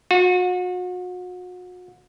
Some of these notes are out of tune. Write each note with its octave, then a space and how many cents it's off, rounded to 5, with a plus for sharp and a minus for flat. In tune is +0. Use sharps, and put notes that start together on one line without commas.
F#4 -35